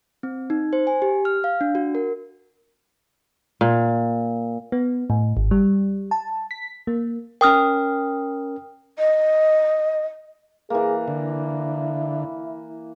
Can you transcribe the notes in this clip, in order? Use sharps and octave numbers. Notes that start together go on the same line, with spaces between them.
C4
D#4
C5
G#5
G4
F6
F5
D4
F#4
A#4
A#2
B3
A2
G#1
G3
A5
B6
A#3
C#4 A#4 G5 D#6 F6
D#5
E3 A#3 G#4
D3 E4